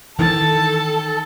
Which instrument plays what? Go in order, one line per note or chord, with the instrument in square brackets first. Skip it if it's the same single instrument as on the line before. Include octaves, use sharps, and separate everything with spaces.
[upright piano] D#3 [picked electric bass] E3 [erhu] A4 [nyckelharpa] A5